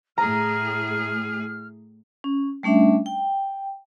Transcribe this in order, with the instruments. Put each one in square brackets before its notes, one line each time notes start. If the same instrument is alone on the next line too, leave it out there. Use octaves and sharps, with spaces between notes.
[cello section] A2 A3 G#4 [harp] A#5 [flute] F6
[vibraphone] C#4
G3 A3 C#4 D4 E5
G5